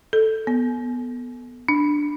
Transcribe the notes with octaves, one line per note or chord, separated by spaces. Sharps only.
A4
B3
D4